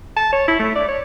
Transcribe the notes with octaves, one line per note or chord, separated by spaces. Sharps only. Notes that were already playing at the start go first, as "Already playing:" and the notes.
A5
C#5
E4
A3
D5
C#5